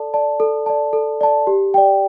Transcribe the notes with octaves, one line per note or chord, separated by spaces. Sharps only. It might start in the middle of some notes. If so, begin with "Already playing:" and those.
Already playing: A4 D5 A5
D5 A5
A4
D5 A5
A4
D5 A5
G4
D5 G5